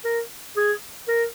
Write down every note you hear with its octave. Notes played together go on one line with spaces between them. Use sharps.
A#4
G#4
A#4